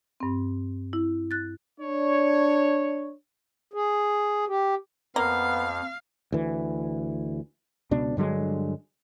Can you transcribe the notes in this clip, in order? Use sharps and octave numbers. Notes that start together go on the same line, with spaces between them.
G2 C4
E4
F#6 A6
D4 C#5
G#4
G4
F2 A#3 B3 F5
D2 E3
C#2 B2 D4
G2 D3 F#3 G#3